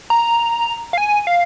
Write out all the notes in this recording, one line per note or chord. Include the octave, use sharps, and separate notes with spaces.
A#5
F5
G#5
F5